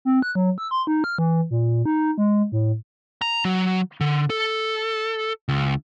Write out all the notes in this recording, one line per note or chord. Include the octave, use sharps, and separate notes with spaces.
C4
F#6
F#3
E6
C6
D#4
F6
E3
A#2
D#4
G#3
A2
A#5
F#3
D3
A4
C#2